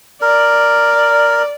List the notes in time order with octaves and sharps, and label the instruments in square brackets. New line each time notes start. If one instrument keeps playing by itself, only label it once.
[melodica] A#4 [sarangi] D5